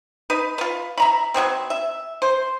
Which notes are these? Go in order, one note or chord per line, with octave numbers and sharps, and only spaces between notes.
D#4 B4
F4 B4
E5 A#5 B5
F#3 G3 B3 C4
E5
C5